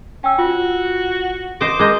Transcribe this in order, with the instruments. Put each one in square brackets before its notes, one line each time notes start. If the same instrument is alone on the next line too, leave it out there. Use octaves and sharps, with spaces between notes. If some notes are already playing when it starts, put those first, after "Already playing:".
[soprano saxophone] C#4 [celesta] G5 E6
[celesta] F4 [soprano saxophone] F#4
[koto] C5 D#5 [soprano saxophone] D6
[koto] G#3 D#5 [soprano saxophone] A#4 [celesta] D6 G6